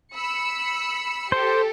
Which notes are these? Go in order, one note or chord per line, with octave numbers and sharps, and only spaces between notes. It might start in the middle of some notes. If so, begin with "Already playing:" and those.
B5 E6 C#7
G4 A4 C5